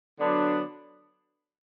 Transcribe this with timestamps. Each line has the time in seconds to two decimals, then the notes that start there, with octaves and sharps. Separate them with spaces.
0.19 D3 F#3 B3 D4